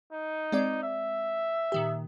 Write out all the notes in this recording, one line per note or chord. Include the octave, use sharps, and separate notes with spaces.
D#4
G#3 C4 D5
E5
A#2 D#3 G4